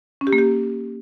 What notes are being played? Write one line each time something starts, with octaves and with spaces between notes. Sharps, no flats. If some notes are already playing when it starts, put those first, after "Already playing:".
C#4
G4
A#3
G4